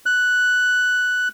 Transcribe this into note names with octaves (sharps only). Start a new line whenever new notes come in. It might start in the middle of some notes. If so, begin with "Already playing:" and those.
F#6